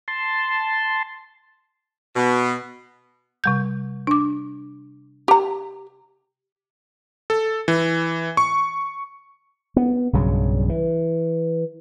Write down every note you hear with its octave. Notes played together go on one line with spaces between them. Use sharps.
A5 C6
B2
C3 G3 G6
D4 D6
G4 A#5
A4
E3
C#6
B3
B1 G2 C#3 F#3
E3